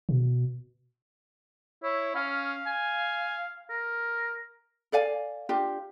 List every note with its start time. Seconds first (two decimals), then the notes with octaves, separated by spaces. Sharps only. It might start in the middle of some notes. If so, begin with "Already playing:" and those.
0.09 B2
1.84 E4 C#5
2.15 C#4 F5
2.67 G#5
3.70 A#4
4.92 A4 D5 F5 G#5
5.49 D4 F4 G4